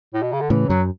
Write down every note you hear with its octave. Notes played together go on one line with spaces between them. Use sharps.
A2
B2
C#3
D3
A2 C#3 E3
F#2 F#3